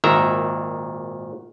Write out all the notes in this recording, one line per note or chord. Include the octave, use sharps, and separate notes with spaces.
G#1 A#2 D#3 E5 A#5